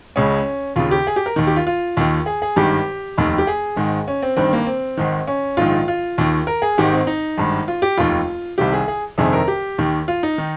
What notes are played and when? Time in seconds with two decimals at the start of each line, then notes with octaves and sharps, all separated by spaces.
0.16 C#2 C#3 C#4
0.76 D#2 C#3 F4
0.91 G4
1.07 G#4
1.16 G4
1.26 A#4
1.36 D#2 D#3
1.47 G4
1.56 F4
1.67 F4
1.97 D#2 D#3
2.26 G#4
2.42 G#4
2.56 G#1 G2 D#3 G4
3.17 F1 D#2 D#3
3.38 G4
3.47 G#4
3.76 G#1 G#2 D#3
4.08 C#4
4.23 C4
4.36 G1 G2 D#3 C4
4.53 A#3
4.67 C4
4.97 G#1 G#2 D#3
5.27 C#4
5.57 A#1 G#2 D#3 F4
5.88 F4
6.18 D#2 D#3
6.47 A#4
6.62 G#4
6.78 G#1 G#2 D#3 G4
6.92 C4
7.07 D#4
7.38 G#1 G2 D#3
7.68 F4
7.82 G4
7.97 F1 D#2 D#3 F4
8.58 C2 C3 D#3 G4
8.73 G#4
8.88 G#4
9.18 G1 F2 C3 D#3 G#4
9.33 A#4
9.48 G4
9.78 D#2 D#3
10.08 F4
10.23 D#4
10.38 D#3